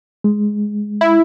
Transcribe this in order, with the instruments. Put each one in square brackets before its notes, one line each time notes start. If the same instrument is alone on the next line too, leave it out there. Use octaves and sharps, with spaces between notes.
[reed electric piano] G#3
[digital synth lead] E4